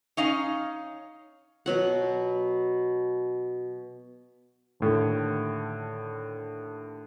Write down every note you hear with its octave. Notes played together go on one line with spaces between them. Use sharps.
C#4 D#4 F5
B2 F#3 F#5
D#2 A2 D3